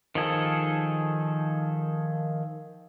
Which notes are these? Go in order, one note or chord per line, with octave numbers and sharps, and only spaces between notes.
D#3 F3 G#4 A4